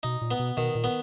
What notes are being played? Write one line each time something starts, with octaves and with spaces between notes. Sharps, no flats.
B2 D#4
A#2
B3
B2
B2 D#3
A#2
B3